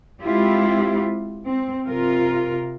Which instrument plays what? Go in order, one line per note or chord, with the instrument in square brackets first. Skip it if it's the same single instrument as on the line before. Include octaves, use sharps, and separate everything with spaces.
[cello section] G#3 C4 E4 F4 G4
C4
C3 F4 A#4